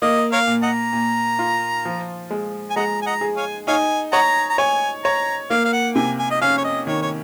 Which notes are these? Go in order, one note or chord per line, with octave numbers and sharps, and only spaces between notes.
A#3 D#5
A#4 C#5 F5
A#2
D#5 F#5 A#5
A#2
F4
F3
G#3
G#5
G#3 D#5 F#5 A#5
G#5
D#5 F#5 A#5
G#4
C#5 F5 G#5
D#4 C#5 F5 G#5
C#5 D#5 F#5 A#5
A#5
C#5 G#5
C#5 A#5
A#3 F5
F5
F#5
C3 G#5
G#5
D#5
C#4 F5
C#5
D#5
D#3 C#5
C#5